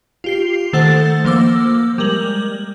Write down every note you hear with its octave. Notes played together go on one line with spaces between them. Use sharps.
F4 G4 C7
D#3 A3 A4 C5 F#5 A6
F3 A#3 C5 D6 E6
G3 G#3 A#4 F#7